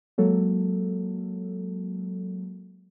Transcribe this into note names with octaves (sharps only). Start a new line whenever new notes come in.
F#3 G#3 A#3 A4